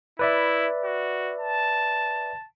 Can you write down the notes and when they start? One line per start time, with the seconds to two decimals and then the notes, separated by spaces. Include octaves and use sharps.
0.19 E4 B4 D5 E5
0.84 F#4
1.40 A5